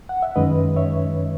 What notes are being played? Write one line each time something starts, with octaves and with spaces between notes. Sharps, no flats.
F#5
E5
F#2 D#3 G#3 C#4 B4 D#5
C#5 E5